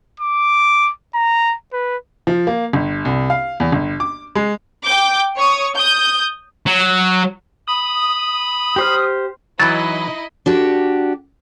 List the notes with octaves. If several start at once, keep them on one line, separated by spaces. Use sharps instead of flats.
D6
A#5
B4
F3
A#3
G1
C2
F5
E2
G1
D6
G#3
G5 D6 G6
C#5 C#6 D#6
D#6 G6
F#3
B5 D#6
G4 C5 F6
E3 F#3 D#4 E4 D#5 A6
D4 F#4 G4